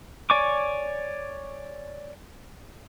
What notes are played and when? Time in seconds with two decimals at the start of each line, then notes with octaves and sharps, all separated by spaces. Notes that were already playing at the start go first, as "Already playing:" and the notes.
0.30 C#5 D5 G#5 C#6 D6